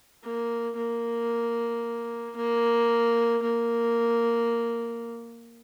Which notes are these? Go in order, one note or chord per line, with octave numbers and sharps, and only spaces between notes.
A#3
A#3
A#3
A#3